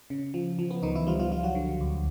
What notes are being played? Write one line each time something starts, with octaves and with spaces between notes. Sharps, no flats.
C#3
F3
F3
B3
C#2 D#3 D#4
E3 E4
F3 G3 F4
F3 F4
F3 G3 F4
F#3 F#4
D3
D2